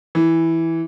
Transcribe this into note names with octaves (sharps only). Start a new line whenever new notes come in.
E3